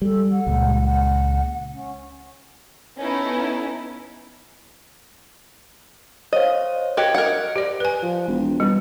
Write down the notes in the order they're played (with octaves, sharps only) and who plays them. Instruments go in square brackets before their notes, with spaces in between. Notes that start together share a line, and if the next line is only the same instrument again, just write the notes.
[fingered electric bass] G3 [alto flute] A4
[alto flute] F#5
[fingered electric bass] C#2 A#2 G#3
[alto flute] F#5
C#4
[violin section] B3 C#4 D#4 E4 A4
[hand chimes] C5 C#5 F5 [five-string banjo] D#5
[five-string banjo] F#4 G4 A#4 [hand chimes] D#5 F#6 G#6
[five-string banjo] A#4 F#5
[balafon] G4 D5
B4 G#5
[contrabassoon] F3
E1
[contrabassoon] B2 [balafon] G3